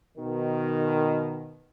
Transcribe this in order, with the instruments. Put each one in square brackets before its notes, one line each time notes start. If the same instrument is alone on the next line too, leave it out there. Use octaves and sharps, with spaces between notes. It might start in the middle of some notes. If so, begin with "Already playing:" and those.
[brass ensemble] B2 D#3